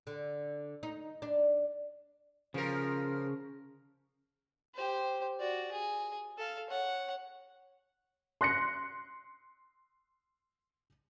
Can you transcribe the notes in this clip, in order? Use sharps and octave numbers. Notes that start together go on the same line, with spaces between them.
D3
D#4
D4
C#3 F3 A#4
G4 C5
F#4 D5
G#4
A4 F5
C#5 F#5
C6 F#6 A#6 C#7